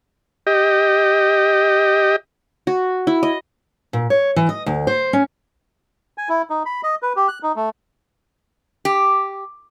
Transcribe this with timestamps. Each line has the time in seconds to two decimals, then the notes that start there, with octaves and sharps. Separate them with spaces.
0.47 G4 D#5
2.67 F#4
3.07 E4
3.23 D#5
3.93 A#2
4.10 C#5
4.36 E3
4.49 D#5
4.66 D2
4.87 C5
5.13 C#4
6.18 G#5
6.29 E4
6.50 D#4
6.66 B5
6.83 D#5
7.02 B4
7.16 G4
7.28 F#6
7.43 D#4
7.56 A3
8.85 G4